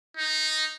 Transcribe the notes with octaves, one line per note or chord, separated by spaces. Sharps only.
D#4